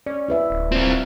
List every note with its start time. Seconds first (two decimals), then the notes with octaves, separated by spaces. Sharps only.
0.06 C#4 D5
0.28 E4 B4 E5
0.50 D1
0.72 C4 E4 F4